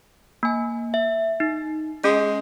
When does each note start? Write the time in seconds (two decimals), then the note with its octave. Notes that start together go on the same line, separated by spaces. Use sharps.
0.43 A#3 G#5
0.94 E5
1.40 D#4
2.04 G#3 C#4